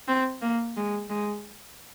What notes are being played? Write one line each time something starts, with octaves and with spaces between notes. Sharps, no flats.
C4
A#3
G#3
G#3